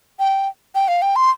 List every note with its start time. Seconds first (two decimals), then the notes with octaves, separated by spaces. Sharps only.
0.19 G5
0.75 G5
0.88 F5
1.02 G5
1.16 C6